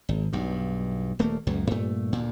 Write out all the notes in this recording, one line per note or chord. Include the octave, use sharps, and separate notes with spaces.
G#1
B1 G2
D#1 A3 A#3
C#2 F#2 A#2
G2 A#2 A3
D2 A#2